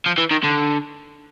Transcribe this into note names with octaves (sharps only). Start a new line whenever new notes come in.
F3
E3
D#3
D3